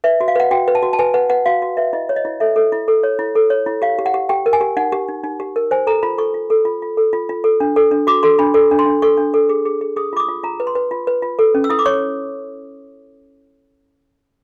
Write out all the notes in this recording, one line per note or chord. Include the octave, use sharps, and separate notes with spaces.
B4 E5
F#4
F5
B4 F#5
F#4 G5
B4
A5
F#4
A5
B4 G#5
B4 F#5
B4 F#5
F#4 F5
F#4
B4 E5
E4 D#5
C#5
D#5
E4
A4 E5
A4
E4
A4
C#5
E4
A4
C#5
E4
G4 F5
G4
F#5
G4
G4 G5
A#4
G#5
G4
D#4 F#5
G4
D#4
D#4
G4
A#4
C5 G#5
A4 A#5
F4 B5
A4 C#6
F4
A4
F4
F4
A4
F4
F4
A4
D4
A4
D4
F#4 D6
A4 C6
D4 B5
A4
D4
C6
D4
A4 C#6
D4
A4
G#4
G#4
G#4
G#4 D#6
F4 D6
D#6
F4
F4 A#5
B4
C6
B4
F4
B4
F4
A4
C#4
E6
E4 D#6
D6
C#5 C#6